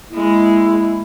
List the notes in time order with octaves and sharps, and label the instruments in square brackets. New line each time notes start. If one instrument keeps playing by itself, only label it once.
[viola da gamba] G#3 A#3 [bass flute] E4